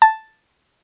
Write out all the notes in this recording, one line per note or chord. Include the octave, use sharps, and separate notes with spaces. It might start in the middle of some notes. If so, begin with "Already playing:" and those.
A5